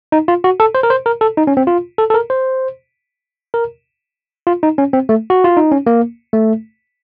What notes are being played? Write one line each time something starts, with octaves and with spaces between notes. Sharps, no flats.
D#4
F4
F#4
A4
C5
A#4
C5
A#4
A4
D#4
C#4
C4
F4
A4
A4
A#4
C5
A#4
F4
D#4
C#4
C4
A3
F#4
F4
D#4
C#4
A#3
A3